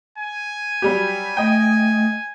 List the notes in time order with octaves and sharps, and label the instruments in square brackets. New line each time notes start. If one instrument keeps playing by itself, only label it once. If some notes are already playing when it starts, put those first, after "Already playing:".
[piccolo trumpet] G#5
[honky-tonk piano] F#3 G3 G4
[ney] A3 [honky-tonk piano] D#5 G5